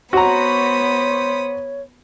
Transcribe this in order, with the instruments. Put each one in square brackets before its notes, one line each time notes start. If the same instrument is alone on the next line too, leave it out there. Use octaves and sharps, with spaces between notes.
[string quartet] B3 B5 D#6 [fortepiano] F#4 A#5 [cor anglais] C5 [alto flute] C#5